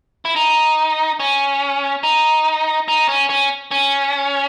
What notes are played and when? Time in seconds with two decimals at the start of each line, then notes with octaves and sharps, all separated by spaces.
0.25 E4
0.36 D#4
1.20 C#4
2.03 D#4
2.88 D#4
3.09 C#4
3.29 C#4
3.71 C#4